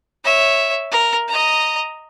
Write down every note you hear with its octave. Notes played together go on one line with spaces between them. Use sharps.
C#5 E5
A#4
D#5 A#5